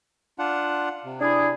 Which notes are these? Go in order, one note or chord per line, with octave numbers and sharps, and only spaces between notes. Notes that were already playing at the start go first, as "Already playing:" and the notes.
D4 F4 F#5
C3
D4 E4 G#4